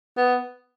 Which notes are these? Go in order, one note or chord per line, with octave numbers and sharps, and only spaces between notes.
B3